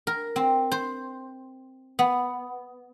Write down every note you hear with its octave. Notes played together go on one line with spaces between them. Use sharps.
A#4
C4
C5
B3